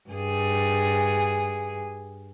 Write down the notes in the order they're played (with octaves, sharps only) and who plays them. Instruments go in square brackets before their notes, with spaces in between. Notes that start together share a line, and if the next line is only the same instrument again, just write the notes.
[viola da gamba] G2 G#4